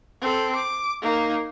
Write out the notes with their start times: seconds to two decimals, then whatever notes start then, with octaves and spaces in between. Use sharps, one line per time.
0.21 C4 A4
0.56 D6
1.02 A#3 D#4